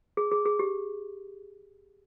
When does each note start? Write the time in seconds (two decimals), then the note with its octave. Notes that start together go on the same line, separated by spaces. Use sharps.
0.17 G#4
0.31 G#4
0.45 G#4
0.59 G4